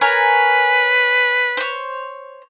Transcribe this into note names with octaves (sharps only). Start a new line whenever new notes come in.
A#4 B4 C#5 G#5
C5 C#5